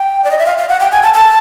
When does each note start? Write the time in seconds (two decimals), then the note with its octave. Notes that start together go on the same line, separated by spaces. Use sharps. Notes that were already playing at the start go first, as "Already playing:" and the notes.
Already playing: G5
0.24 D5
0.31 D#5
0.39 E5
0.46 F5
0.58 F5
0.69 F#5
0.80 G5
0.92 G#5
1.03 A5
1.14 A5